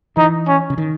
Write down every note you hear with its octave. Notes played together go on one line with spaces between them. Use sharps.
E3 D#4
C#4
C#3
D#3